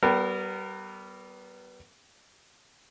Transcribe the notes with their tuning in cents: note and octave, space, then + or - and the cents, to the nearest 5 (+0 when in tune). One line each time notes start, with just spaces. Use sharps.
G3 -30 B3 +0 A#4 -25